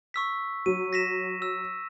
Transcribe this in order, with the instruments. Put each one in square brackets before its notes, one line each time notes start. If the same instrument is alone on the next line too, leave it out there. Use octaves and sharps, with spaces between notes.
[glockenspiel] C#6 E6 B6
[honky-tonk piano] F#3 [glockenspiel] D#7
[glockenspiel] A#6 B6 E7
E6